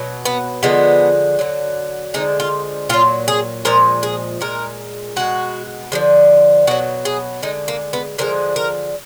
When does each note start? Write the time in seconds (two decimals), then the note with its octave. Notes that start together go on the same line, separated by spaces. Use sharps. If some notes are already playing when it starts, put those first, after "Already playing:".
Already playing: B2 F#3
0.25 B3
0.63 D3 F3 G#3 B3
1.39 D3 F#3
2.14 D3 F3 G#3 D#4
2.40 F4
2.89 A#2 F#3 F4
3.28 G#4
3.65 A#2 F3 G#3 A#4
4.03 G#4
4.41 A#2 G#3 A#4
5.16 B2 G#3 F#4
5.92 D3 F3 G#3
6.67 B2 F#3 F#4
7.05 G#4
7.43 D3 G#3 D#4
7.68 A#3
7.93 B3
8.18 D3 F3 G#3 A#4
8.56 A#4